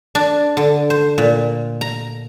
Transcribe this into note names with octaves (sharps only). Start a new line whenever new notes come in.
D4
D3
C5
A#2
A#5